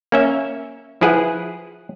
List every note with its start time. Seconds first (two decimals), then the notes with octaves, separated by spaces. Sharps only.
0.12 A#3 C#4 E5
1.01 F3 E4 G#4 B4 F#5